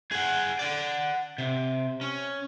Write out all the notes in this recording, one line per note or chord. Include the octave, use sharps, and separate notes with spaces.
G#4 F#5
D5 F#5
C3
C#4